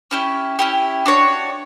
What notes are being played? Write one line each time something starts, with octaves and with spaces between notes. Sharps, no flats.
C#4 E4 G4
C#4 E4 G4
D4 F#4 C#5